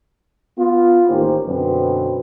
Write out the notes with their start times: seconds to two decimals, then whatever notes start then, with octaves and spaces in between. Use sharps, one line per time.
0.58 B3 F4
1.09 A1 D#3 A#3 C#4 G4 C5
1.47 F#2 B2 D3 C4 B4